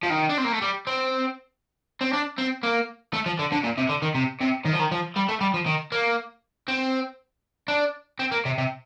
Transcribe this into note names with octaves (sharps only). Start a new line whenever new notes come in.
F3
D#3
D4
C4
A#3
A3
G3
C4
C4
D4
C4
A#3
A3
F3
D3
D3
A#2
C3
D3
D#3
C3
C3
D#3
F3
D#3
F3
G3
A3
G3
F3
D#3
A#3
C4
D4
C4
A#3
C3
C3